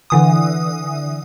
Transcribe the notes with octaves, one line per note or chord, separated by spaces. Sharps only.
D3 E3 D#6